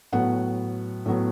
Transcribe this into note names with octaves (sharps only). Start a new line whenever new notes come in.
A2 F#3 B3 F#5
A2 F#3 B3